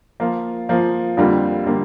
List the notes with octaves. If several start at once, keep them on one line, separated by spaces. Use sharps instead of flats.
F3 A#3 F4
F3 A#3 F4
F2 D3 G3 A#3 F4
D3 G3 A#3 F4